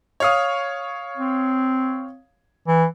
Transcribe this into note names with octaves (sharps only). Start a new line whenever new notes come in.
C#5 F5 D#6
C4
E3